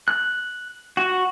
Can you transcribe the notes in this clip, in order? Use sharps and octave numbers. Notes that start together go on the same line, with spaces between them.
F#6
F#4